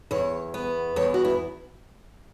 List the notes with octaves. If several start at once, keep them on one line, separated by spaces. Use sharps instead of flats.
E2 C#5
B3
E2 C#5
F#4
E4